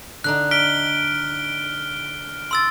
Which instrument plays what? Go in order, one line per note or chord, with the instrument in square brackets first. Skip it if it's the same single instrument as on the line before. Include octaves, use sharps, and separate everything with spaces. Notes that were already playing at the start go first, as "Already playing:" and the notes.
[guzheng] D3 D4 D#4 [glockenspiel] F#6
[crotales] F6 D7 G7 [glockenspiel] B6
[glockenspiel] C6 E6 A6